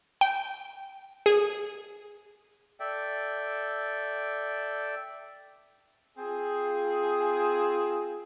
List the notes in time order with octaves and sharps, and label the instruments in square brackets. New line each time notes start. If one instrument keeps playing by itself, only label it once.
[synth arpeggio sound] G5
G#4
[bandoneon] A4 D5 E5 G5
[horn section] C4 F4 G#4